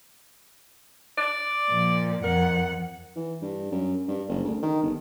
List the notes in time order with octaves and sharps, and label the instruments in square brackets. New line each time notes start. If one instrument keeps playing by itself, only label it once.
[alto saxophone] D5
[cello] A#2 F3
[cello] F2 F#5 [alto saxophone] A#4
[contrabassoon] E3
G2
F#2
G2
F#1
D2
D#3
G1